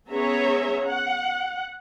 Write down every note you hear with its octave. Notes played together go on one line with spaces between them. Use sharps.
B3 C#4 G#4 C#5 E5 A#5
F#5